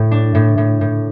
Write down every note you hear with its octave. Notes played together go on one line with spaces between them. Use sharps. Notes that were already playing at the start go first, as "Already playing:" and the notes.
Already playing: A2
D4
A2
A2
A2